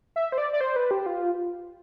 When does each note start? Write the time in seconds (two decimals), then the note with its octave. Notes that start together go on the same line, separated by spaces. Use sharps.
0.16 E5
0.32 C5
0.38 D5
0.53 D5
0.61 C5
0.76 B4
0.91 G4
1.06 F4